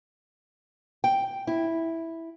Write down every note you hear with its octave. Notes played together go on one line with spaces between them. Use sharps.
G5
E4